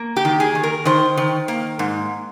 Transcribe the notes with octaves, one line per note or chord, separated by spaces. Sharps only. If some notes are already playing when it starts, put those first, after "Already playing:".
Already playing: A#3
G4
D#3
G#4
D#3
A#4
D#3 C5
D#3
A#3
G#2